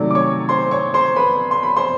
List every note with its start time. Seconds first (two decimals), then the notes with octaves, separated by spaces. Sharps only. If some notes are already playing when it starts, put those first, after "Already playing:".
Already playing: C3 D#3 F#3 A3 D5
0.11 D6
0.15 C#5 C#6
0.49 C5 C6
0.71 C#5 C#6
0.94 C5 C6
1.16 B4 B5
1.51 C6
1.63 B5
1.76 C5 C6